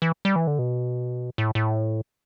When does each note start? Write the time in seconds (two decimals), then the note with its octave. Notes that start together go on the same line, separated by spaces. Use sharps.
0.02 E3
0.25 G3
0.36 E3
0.47 D3
0.59 B2
1.38 A2
1.55 A2